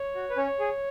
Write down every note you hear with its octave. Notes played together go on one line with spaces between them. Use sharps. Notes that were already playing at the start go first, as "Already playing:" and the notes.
Already playing: C#5
F#4
B4
C#4 C#5
G#4